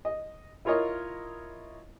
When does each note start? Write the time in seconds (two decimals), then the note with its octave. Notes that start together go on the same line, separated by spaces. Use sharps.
0.05 D#5
0.65 E4 F4 A#4 C#5 D#5